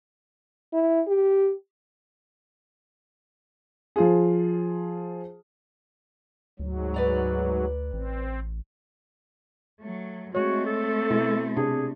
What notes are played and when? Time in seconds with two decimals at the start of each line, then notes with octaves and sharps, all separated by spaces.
0.73 E4
1.07 G4
3.96 F3 F4 G#4
6.59 D2 G#2 F#3
6.94 B4 D5 A#5
7.93 A1 C4
9.80 F#3 A3
10.35 G#3 A3 C4 F#4 C#5
10.66 A4
11.10 B2 E4
11.57 C3 D4 G#4